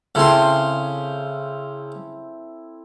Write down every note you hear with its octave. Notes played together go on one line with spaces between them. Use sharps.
C#3 C4 E4 A4 C6